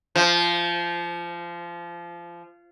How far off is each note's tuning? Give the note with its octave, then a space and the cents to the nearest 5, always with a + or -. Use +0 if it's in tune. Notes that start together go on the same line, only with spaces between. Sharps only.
F3 -20